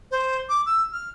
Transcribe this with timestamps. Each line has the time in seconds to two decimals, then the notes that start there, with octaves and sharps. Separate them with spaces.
0.11 C5
0.49 D6
0.66 E6
0.93 F6